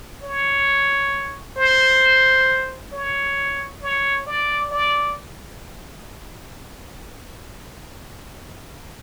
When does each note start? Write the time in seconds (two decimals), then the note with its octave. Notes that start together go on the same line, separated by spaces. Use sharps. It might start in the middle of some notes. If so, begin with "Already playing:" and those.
0.23 C#5
1.57 C5
2.92 C#5
3.82 C#5
4.26 D5
4.71 D5